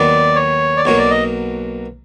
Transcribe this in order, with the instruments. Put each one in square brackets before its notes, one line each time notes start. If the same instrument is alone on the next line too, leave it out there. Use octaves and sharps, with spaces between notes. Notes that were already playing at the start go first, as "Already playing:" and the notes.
Already playing: [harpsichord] D#2 D#3 F#3 B3 [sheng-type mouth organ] D5
[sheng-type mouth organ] C#5
D5
[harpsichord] B1 B2 F#3 A#3 [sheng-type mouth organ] C#5
[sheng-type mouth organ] D5
D#5